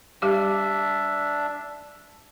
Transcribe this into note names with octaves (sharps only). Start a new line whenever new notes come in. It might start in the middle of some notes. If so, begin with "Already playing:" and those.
G3 D4 G4 E5 D6